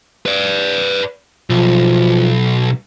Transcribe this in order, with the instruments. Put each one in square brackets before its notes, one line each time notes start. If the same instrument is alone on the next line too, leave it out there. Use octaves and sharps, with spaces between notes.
[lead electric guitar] B4 D5
[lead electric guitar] B1 [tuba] F3